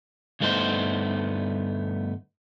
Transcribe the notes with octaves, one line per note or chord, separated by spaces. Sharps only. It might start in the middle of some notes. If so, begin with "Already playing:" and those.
D2 G2 A3 B3 D#4 C5